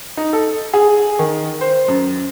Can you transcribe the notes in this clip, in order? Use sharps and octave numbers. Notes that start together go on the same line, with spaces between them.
D#4
A4
G#4
D#3
C5
F#2